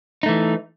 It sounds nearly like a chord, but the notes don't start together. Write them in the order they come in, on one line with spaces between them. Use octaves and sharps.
D#4 A3 E3